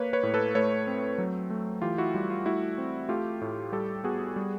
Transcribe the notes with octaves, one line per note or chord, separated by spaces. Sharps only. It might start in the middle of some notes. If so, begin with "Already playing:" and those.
Already playing: A#3 B4 C#5
B4 C#5
A2
A4 B4
A3 B4 C#5
C4
F#3
A3
E3 F4 G4
E4 F#4
G3 F4
F4
A3 E4 F#4
C4
A3 F4 G4
A2
G3 G4 A4
B3 F#4 G#4
G3